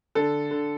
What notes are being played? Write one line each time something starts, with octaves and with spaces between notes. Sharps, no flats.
D3 A4
D3